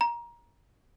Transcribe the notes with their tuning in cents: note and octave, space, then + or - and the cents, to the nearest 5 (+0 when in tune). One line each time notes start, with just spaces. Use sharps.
A#5 +20